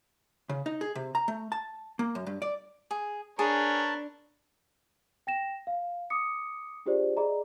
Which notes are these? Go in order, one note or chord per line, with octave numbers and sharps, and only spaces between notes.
C#3
D#4
G#4
C3
A#5
A3
A5
A#3
F#2
G2
D5
G#4
D4 G#4 A#4 B4 C#5 A5
G5 A#6 E7
F5
D6 D#6 C#7
D4 F4 G4 G#4 C5 D5
G#4 D5 D#5 A#5 B5